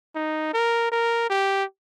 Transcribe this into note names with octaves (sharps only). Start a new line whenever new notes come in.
D#4
A#4
A#4
G4